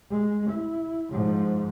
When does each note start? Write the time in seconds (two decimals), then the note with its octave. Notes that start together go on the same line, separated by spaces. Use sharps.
0.10 G#3
0.50 E4
1.11 G#2 F3